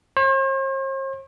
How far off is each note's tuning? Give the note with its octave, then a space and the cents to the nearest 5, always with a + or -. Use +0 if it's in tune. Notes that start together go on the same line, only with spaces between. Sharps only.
C5 +45